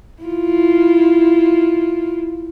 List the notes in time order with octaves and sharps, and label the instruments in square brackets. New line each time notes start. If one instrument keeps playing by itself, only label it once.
[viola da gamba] E4 F4